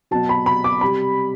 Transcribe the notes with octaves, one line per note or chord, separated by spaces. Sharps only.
B2 F#3 A5
B5
B5
D6
C3 G3 B5